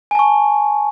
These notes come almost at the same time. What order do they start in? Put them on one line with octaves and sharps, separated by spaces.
G#5 A5 C#6